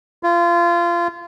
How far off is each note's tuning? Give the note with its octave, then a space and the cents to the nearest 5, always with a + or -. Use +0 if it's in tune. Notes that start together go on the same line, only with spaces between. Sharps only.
F4 -25